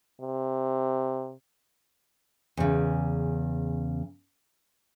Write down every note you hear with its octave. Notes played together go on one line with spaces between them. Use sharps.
C3
E2 C#3